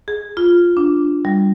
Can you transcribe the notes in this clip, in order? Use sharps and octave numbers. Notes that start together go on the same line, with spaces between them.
G#4
F4
D4
G3